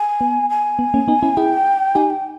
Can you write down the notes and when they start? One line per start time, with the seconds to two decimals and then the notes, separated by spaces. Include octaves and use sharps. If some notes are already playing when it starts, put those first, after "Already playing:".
Already playing: G#5
0.21 B3
0.50 G#5
0.79 B3
0.94 A#3 C#4
1.08 B3 D#4
1.23 C#4 E4
1.37 E4 G#4 G5
1.95 D#4 G4 G#5
2.10 G5